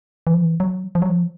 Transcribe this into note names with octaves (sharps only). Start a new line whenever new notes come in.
E3
F3
E3
F#3
F3
F#3
F3